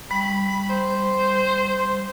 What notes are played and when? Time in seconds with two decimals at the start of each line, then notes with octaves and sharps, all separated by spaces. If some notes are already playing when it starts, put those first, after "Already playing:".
0.11 G3 B5
0.70 C5